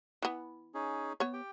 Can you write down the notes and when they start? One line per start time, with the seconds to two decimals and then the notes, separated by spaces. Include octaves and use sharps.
0.22 E3 B3
0.74 C#4 D#4 G#4
1.20 B3 C#5
1.33 G4 G5